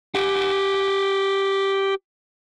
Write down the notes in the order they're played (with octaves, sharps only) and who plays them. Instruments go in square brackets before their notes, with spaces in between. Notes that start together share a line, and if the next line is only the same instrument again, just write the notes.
[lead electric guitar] G4 F#5